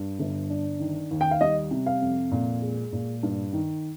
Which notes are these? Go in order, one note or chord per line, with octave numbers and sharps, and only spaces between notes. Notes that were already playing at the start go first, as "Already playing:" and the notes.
Already playing: G2
G1
D4
D#3
D#2
G5
F5
G3 D#5
C3
F5
F2
A#2
G#3
A#2
G2
D#3